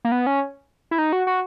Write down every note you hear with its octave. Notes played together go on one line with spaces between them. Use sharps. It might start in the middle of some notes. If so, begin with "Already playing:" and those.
A#3
B3
C#4
E4
D#4
F#4
F#4